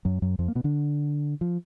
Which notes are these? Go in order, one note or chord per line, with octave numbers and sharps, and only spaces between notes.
F#2 F#3
F#2 F#3
F2 F3
A#3
B2 B3
D3 D4
F3